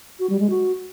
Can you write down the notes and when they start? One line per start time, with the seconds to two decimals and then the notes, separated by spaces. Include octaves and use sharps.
0.19 F#4
0.30 G3
0.40 G#3
0.50 F#4